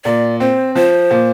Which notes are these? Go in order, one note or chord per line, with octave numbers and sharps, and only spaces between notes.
A#2 D5
C4 C5
F3 C5
A#2